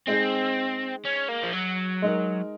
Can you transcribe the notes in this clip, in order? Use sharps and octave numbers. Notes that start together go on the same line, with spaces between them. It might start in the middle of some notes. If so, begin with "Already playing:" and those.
G#3 C4 D#4 G#4
C#4
A#3
F3
F#3
G#3 D#4 A#4